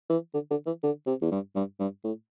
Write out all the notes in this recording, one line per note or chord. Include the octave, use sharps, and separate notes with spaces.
E3
D3
D3
E3
D3
C3
E2
G2
G2
G2
A2